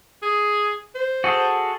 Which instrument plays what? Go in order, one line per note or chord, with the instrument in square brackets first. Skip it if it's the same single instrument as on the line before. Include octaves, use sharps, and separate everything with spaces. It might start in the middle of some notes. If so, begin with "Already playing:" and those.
[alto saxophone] G#4
C5
[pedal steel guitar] F#4 G#4 A4